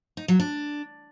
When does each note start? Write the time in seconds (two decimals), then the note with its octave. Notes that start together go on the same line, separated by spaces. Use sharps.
0.17 D#4
0.28 F#3
0.40 D4